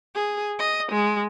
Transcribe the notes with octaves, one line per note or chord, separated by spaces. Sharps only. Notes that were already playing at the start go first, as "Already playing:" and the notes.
G#4
D#5
G#3